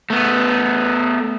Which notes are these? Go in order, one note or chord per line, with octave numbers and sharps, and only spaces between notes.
A3 B3